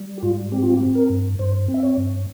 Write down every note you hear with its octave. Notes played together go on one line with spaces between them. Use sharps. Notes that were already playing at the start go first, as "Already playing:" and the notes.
Already playing: G3
G4
G#2 F4
C4 G4
F4
G4
C4
A#4
G2
G2 C5
C4
E5
C#5
G2